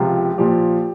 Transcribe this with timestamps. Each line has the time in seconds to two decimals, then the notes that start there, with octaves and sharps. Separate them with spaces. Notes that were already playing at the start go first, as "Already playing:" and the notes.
Already playing: C#2 C3 F3 F4
0.38 A#2 F3 G4